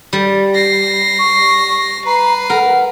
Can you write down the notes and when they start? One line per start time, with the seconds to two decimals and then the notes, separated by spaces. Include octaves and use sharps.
0.13 G3
0.55 A#6 C7
1.19 C#6
2.06 B4 A#5 C7
2.50 A#4 F#5